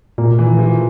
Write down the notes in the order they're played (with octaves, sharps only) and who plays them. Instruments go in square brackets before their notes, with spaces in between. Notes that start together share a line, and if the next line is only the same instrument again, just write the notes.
[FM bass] A#2 [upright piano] A#3
[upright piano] E3
F3